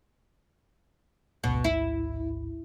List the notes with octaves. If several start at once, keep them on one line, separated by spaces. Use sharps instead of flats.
A1 D2 G#2 B2
E4